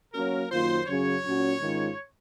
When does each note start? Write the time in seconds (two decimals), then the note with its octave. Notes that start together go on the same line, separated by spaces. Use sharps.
0.13 F#3 A#3 C#4 F#4 A#4 C#5
0.50 F#2 D#3 A#3 F4 C5
0.87 F#2 C#3 F#3 C#4 G#4 C#5
1.23 A#2 F#3 C#4 F#4
1.60 G#2 D#3 G#3 C#4 F4